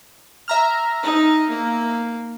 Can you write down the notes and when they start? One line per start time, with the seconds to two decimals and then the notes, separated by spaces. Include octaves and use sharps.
0.48 E5 A#5 F6
1.03 D#4
1.50 A#3